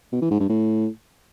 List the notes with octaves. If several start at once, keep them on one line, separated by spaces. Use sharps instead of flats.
B2
E3
G#2
G2
A2